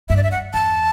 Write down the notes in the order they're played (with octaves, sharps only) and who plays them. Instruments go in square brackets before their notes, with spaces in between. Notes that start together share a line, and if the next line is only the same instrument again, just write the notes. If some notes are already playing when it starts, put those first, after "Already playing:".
[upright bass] G2 [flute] E5
[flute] D5
E5
F#5
[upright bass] E2 [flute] A5